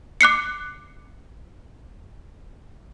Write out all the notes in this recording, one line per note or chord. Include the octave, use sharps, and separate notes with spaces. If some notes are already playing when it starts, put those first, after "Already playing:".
D6 F#6 C7 C#7